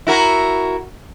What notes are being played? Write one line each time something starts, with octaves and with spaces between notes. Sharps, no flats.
E4 F#4 A#4